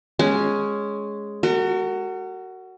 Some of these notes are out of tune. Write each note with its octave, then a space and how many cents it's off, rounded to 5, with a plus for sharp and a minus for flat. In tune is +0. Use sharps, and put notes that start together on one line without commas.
G#3 +0 C#4 +0
F#4 +15 A#4 -40